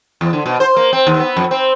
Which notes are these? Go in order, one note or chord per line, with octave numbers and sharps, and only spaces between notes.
E2
D3
B2
C5
A#3
C4
D#2
B3
F2
C4